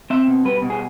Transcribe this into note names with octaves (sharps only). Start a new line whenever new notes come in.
C4 E5
B2
G3 B4
B2
G#4